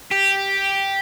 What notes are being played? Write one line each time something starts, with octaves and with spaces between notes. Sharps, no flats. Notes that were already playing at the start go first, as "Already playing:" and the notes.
G4